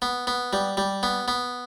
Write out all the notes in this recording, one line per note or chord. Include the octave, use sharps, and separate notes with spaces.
B3
B3
G3
G3
B3
B3